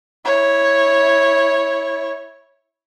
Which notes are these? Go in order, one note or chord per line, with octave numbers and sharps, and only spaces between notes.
E4 C#5